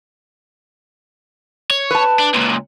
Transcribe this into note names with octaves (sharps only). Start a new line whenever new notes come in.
C#5
B4 A5
D4
C#2 A#2